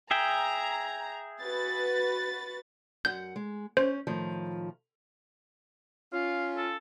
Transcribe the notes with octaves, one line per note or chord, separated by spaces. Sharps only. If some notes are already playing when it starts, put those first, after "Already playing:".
G#4 E5 G5 A#5
F#4 B4 A6
F#2 F#5 G6
G#3
C#4 C5
A2 D#3 F3
C#4 F4 F5
A4